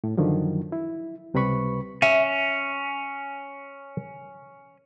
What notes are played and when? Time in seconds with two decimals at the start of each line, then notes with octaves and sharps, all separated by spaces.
0.04 A2
0.17 F#2 D3 D#3 F3 F#3
0.72 E4
1.34 C#2 C3 G3 B4 B5 C#6
2.02 C#4 E5